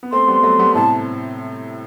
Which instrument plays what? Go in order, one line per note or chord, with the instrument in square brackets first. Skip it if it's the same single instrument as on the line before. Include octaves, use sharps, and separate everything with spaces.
[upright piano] B3
[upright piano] A3 C4 [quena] C6
[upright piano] G3 B3
F#3 A3
G3 B3
[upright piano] A2 C3 [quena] A5